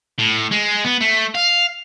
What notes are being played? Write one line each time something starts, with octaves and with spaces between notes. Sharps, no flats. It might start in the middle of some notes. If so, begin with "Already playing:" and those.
A2
G#3
B3
A3
F5